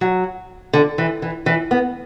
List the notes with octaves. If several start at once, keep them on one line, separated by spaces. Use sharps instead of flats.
F#3
D3
E3
E3
E3
B3